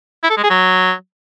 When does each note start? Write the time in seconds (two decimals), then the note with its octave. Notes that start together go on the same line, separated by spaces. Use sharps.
0.24 E4
0.30 A4
0.37 G#3
0.43 G#4
0.50 F#3